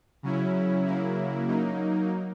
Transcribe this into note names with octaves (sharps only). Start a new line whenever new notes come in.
C#3 F#3 C#4 E4
C#3 F#3 A#3 E4
F#3 A#3 D#4